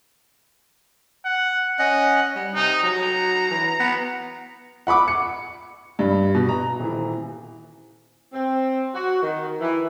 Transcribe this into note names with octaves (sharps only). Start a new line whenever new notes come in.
F#5
C#4 D#5 F#5
G3
C3 D#4
F#3 A#5
E3
B3
F#5 B5 C#6 D6
C#7
G2
B2
A#5
D#1 E3
C4
F#4
D#3
E3